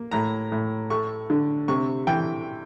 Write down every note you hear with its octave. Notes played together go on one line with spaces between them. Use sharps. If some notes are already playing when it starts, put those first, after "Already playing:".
Already playing: A#3
A2 A#5
A2
A3 C#6
D3
C3 C#6
E3 G5